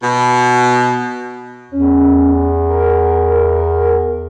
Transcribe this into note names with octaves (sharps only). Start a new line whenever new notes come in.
B2
E2 C#4
A#4